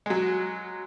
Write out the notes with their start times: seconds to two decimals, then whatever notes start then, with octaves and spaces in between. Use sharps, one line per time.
0.06 F#3 G#3